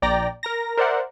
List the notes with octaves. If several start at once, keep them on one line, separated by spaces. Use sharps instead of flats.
A#1 D5 G5 A#5 A#6
A#4 A#5 A#6
A#4 C5 D5 E5 F#5